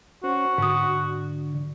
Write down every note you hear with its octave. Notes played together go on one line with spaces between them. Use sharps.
C#4 F#4 C5
G#2 D3 D#6